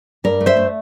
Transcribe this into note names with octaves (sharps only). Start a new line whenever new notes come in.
G2 A#4 D5
A3
C5 E5
A3